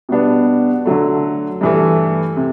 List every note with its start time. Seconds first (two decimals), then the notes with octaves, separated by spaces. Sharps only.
0.09 B2 G3 B3 D4
0.85 D3 F#3 A3
1.61 G2 E3 A3
2.37 C3